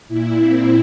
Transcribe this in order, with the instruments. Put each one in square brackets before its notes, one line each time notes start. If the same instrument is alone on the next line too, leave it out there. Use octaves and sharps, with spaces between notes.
[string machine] A#2 E4
C4